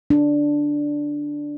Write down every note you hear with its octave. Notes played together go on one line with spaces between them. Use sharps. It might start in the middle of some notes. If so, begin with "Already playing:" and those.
D4